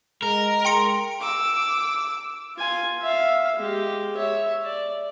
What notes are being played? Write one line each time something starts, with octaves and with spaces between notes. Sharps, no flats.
G#3 A#4
G5 C6 C#7
D6 E6
F4 G#5
E5 F5
G#3 G4
C#5 E5
D5